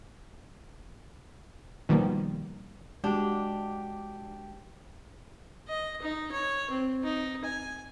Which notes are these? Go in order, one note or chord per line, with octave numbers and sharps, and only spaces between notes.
B2 D#3 F3 G3 A#3
G#3 D4 F#4 G4
D#5
D#4
C#5
C4
D#4
G#5